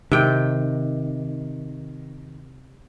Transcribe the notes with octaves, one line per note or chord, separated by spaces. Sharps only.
C3 D#3 G5